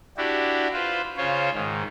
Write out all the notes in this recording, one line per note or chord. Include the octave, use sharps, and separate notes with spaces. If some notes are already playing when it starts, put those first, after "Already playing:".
D4 E4 F#4 G4
F4 B4 C5
C#3 F4 C5 C#5
G#2 D#3